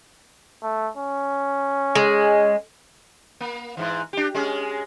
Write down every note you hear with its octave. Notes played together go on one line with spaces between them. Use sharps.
A3
C#4
G#3
A#3
G#2 E3
D4 G4
G#3 C#4 G#4